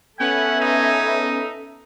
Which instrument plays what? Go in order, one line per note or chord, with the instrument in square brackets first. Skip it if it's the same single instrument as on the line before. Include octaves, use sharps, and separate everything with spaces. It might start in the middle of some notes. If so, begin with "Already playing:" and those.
[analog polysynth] B3 C#4 B4 [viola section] A4 E5 [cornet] F#5 [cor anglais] G#5
[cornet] D#4